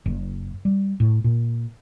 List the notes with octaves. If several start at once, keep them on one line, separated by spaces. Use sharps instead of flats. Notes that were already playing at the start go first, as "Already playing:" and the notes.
F#1
G3
A2
A#2